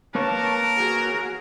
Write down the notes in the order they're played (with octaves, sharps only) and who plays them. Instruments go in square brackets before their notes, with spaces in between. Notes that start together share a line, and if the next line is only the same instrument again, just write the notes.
[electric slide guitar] A#3 B4 C#5 [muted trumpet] A#4 [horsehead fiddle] A5
[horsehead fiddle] F#4 G#4